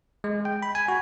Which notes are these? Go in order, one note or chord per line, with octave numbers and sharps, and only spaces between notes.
G#3
G5
B5
G#5
F#4